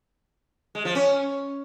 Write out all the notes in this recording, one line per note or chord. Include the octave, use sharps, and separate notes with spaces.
G#3
F3
C#4